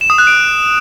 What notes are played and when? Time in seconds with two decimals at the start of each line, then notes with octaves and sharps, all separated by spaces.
0.01 E7
0.10 D#6
0.18 F#6
0.27 D7